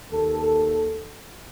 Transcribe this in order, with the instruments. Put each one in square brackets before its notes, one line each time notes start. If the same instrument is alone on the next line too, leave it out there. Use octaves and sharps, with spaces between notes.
[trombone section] D#2 A4